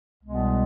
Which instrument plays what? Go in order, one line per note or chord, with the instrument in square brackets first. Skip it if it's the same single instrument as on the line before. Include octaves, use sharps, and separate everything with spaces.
[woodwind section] C2 B2 G#3 B3